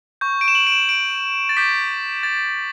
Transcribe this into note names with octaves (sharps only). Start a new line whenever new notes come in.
C#6 G6
D7
E7
F#7
D7
E7
D7
A6
D6 G6 B6
A6